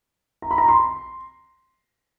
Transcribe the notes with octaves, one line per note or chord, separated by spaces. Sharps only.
A#5
B5
A#5
C6